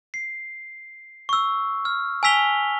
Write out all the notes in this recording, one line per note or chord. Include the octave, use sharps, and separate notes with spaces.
C7
C#6 E6
F6
G#5 A5 E6 B6 F7 G7